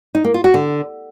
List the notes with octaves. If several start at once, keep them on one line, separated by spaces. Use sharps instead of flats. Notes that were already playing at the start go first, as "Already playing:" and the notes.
D#4
A#3
F4
F#4
D3